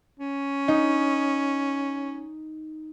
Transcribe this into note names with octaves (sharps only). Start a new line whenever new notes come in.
C#4
D#4